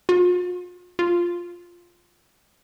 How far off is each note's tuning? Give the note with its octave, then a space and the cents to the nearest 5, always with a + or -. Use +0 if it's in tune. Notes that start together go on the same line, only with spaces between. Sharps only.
F4 +45
F4 +0